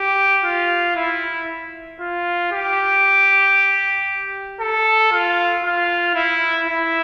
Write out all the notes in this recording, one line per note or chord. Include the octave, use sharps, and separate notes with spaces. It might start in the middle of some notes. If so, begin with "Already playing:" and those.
Already playing: G4
F4
E4
F4
G4
A4
F4
F4
E4
E4